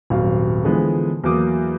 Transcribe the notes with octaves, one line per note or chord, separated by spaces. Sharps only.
D#1 G#1 F#3 F5
D3 E3 F3 G#3 B3
E2 F#3 A#3 D6 D#6